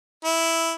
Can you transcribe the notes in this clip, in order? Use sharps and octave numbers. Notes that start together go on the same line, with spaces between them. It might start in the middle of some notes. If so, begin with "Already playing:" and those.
E4